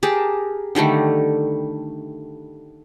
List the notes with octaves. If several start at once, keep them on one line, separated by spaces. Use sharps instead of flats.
G4 G#4 A#4 A5
D3 D#3 G3 A3